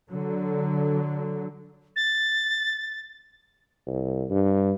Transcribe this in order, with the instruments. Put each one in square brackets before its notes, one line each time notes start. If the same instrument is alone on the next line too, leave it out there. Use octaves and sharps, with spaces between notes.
[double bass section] D3 F#3
[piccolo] A6
[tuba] C2
G2